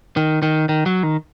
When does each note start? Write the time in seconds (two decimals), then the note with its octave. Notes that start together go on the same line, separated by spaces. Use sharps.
0.17 D#3
0.43 D#3
0.69 D#3
0.86 F#3
1.03 D#3